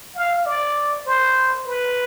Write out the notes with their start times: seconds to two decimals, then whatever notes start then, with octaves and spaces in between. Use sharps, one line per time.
0.15 F5
0.46 D5
1.06 C5
1.67 B4